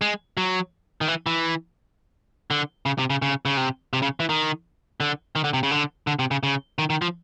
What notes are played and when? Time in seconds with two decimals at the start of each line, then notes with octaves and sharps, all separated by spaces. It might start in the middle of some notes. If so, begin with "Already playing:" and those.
0.01 G#3
0.37 F#3
1.01 D#3
1.08 E3
1.26 E3
2.51 D3
2.86 C#3
2.99 C3
3.10 C#3
3.22 C#3
3.45 C#3
3.57 C3
3.93 C3
4.02 C#3
4.20 E3
4.29 D#3
5.00 D3
5.36 D#3
5.44 D3
5.54 C3
5.63 C#3
5.71 D3
6.07 D3
6.19 C3
6.31 C#3
6.43 C#3
6.79 D#3
6.90 D#3
7.02 F3